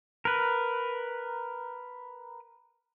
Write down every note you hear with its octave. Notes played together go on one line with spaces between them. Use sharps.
A#4 B4